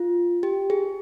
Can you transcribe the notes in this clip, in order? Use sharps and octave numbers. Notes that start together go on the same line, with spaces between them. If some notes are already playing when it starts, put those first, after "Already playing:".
Already playing: F4
G4
G#4